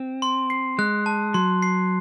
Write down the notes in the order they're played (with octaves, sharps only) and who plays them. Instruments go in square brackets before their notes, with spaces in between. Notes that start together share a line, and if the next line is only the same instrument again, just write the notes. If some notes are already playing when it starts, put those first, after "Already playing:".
Already playing: [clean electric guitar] C4
[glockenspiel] C6
C7
[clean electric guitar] G#3 [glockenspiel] F#6
[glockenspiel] A5
[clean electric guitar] F#3 [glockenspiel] C6
[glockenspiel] C7